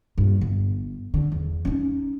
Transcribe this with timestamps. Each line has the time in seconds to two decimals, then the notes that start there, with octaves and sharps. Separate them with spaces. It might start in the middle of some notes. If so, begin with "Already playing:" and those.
0.18 G2 A#2
0.41 G1
1.14 D3
1.32 E2
1.65 C#4 D#4